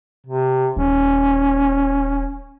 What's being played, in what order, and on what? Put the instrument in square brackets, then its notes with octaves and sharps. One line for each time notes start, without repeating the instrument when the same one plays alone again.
[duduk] C3
[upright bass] D#1 [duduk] C#4